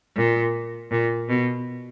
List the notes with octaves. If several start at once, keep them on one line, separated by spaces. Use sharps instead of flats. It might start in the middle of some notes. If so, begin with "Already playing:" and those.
A#2
A#2
B2